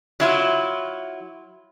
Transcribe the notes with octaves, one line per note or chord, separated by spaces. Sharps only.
F#3 E4 F4